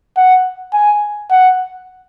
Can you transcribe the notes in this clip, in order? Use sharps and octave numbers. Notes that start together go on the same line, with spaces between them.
F#5
G#5
F#5